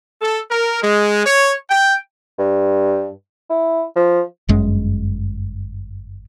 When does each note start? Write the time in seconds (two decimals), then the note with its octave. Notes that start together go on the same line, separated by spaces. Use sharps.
0.22 A4
0.50 A#4
0.82 G#3
1.26 C#5
1.70 G5
2.38 G2
3.50 E4
3.96 F3
4.49 G1 F#2 G#3